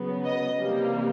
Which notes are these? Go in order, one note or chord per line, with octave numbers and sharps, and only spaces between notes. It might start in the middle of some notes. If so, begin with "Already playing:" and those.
Already playing: C#3 F#3 B3
D#5
C3 E3 G3 A#3